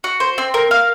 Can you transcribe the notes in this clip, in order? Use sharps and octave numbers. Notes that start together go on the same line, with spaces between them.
F#4
C5
C4
A#4
F5